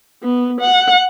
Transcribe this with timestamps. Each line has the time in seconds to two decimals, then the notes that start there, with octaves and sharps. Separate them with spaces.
0.23 B3
0.61 F#5